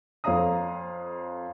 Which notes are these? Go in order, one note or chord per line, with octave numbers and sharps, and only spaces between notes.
F2 A4 C#5 F5 A#5 D#6